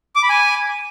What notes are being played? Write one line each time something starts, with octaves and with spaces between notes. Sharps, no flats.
D6
B5
G#5